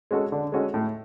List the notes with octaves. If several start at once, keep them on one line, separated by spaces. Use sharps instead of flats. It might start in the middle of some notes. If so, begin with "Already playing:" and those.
G#3 C#4 F#4 A4
D3
G#3 C#4 F#4 A4
A2